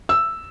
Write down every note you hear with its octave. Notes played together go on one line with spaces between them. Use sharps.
E6